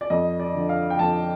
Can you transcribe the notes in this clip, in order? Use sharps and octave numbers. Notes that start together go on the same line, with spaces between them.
D5
F2 D#5
D5
D3 F3
F5
G5
F2 A5